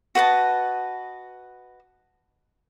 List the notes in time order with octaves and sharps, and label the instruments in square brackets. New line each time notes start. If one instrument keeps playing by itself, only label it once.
[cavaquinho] F#4 B4 D#5 A5